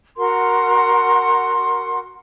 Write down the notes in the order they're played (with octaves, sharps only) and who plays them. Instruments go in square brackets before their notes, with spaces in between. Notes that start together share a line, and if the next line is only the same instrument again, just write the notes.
[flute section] F#4 A#4 F#5 C6